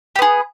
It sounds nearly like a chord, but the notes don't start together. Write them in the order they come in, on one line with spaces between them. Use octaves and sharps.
G4 B3 G#4